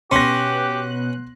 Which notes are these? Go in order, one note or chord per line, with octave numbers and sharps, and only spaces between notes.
B2 B3 C#4 G4 C6 F#6 A#6